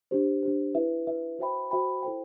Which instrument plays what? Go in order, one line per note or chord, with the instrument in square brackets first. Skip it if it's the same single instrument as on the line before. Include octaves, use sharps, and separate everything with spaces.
[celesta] D4 G4 C5
D4 G4 C5
E4 B4 E5
E4 B4 E5
F#4 C5 E5 G5 B5
F#4 C5 E5 G5 B5
E4 A4 C5 G5